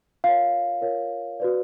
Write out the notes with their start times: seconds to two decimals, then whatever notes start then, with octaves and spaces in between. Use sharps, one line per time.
0.24 F4 A#4 C#5 F5
0.82 F4 A#4 C#5
1.40 F#4 B4 D5